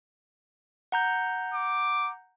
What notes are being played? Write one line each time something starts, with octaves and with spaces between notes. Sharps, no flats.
F#5 A#5 G6
D6